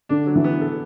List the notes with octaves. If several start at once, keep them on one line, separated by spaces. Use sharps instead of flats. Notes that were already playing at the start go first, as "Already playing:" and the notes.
D3 D4
F#3
E3
B3
A4